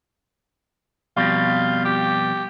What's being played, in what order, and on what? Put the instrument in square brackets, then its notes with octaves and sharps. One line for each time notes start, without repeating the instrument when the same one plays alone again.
[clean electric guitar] F2 B2 G3 [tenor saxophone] F4
[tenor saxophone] G4